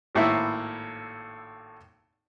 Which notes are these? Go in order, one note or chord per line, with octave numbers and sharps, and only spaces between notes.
G#1 A2 A#3 E4